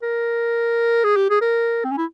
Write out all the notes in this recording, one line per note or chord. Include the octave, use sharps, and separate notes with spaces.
A#4
G#4
G4
G#4
A#4
C4
C#4
E4